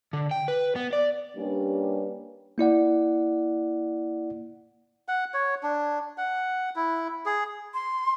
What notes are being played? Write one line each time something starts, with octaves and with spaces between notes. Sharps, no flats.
D3
G5
B4
B3
D5
G3 A#3 C#4 D4 G4 B4
A#3 E4 D5 F#5
F#5
C#5
D4
F#5
E4
G#4
C6